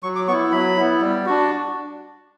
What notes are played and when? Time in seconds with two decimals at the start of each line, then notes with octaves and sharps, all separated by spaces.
0.03 F#3 C#6
0.15 D6
0.28 B3 E4 C#6
0.52 F#3 B5
0.77 B3 E4
1.01 G3
1.26 D4 F#4